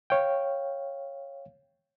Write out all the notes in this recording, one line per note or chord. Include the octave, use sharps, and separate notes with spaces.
C#5 F5 G5